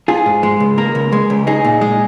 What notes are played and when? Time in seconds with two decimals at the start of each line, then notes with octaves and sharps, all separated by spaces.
0.08 F4 G#4
0.26 G#2
0.43 G#3
0.60 C#2
0.78 A#3 A#4
0.95 C#2
1.13 G#3
1.30 C#2
1.47 D#4 G#4
1.65 A#2
1.81 G#3